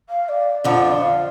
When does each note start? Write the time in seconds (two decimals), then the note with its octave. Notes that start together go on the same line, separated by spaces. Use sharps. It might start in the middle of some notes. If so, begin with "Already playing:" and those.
0.09 F5
0.28 D5
0.64 F2 D3 F3
0.90 D5
1.01 F5